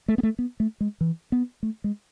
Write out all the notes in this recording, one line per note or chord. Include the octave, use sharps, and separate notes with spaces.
A3
B3
A3
B3
A3
G#3
E3
B3
A3
G#3